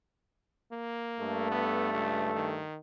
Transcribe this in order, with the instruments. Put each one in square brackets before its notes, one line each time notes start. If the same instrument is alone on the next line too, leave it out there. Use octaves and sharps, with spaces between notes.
[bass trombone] A#3
[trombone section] G2 A3
[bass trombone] B3
C#2
D#3